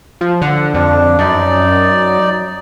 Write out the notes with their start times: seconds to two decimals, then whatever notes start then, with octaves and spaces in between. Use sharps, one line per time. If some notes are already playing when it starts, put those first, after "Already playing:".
0.21 F3
0.42 D3 F#5
0.74 F2 D4
1.19 F#2 D#4 D5